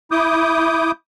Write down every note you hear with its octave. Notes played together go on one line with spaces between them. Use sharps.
E4 D6 D#6 G6